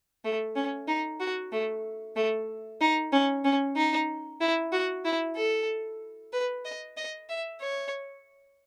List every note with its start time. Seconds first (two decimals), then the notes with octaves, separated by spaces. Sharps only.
0.25 A3
0.56 C#4
0.88 D#4
1.20 F#4
1.52 A3
2.16 A3
2.81 D#4
3.13 C#4
3.45 C#4
3.76 D#4
4.41 E4
4.73 F#4
5.05 E4
5.37 A4
6.33 B4
6.65 D#5
6.97 D#5
7.29 E5
7.61 C#5